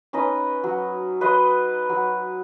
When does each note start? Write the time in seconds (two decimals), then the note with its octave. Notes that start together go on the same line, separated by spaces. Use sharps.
0.13 C#4 D#4 B4 D#5
0.64 F#3
1.21 B4 D#5 C6
1.89 F#3